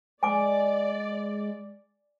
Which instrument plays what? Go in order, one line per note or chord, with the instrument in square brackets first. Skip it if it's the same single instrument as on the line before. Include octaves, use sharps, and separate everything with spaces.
[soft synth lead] G#3 [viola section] D5 [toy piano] G#5 D6